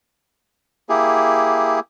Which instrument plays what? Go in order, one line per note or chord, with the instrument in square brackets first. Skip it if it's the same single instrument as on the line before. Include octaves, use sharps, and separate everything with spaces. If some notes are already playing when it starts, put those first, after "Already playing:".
[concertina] A#3 E4 G4 G#4